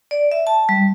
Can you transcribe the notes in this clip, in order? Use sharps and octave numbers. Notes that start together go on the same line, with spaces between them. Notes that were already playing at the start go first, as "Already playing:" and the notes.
D5
E5
A5
G3